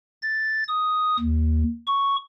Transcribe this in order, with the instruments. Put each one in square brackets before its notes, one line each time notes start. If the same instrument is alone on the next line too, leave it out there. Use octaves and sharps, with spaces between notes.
[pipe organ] A6
D#6
D#2
C#6